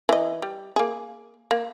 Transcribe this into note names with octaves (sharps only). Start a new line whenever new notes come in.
E3 D#5
G3
A#3 G#4
A#3